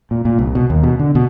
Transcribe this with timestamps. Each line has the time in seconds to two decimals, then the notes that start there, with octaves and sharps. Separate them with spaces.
0.11 A#2
0.25 A#2
0.39 C2
0.55 B2
0.70 D#2
0.83 B2
1.00 D3
1.15 B2